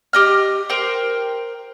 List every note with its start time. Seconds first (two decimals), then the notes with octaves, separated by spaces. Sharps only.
0.13 G4 D#5 F6
0.69 A#4 C5 G5